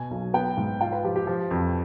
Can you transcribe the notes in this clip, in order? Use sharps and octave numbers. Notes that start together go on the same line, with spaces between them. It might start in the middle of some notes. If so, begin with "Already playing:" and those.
Already playing: B2 G#5
B1
B3 G5
G#2
F4 G5
B4
F3 G4
G4
F3
F2